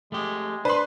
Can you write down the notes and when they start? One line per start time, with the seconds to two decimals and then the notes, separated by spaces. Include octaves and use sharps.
0.12 G#3 A3 G4
0.65 D4 B4 C5 B5 C6